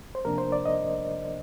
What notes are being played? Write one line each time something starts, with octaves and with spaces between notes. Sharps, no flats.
C5
C3 F3 A#3 D4 A#4
C5
D5
D#5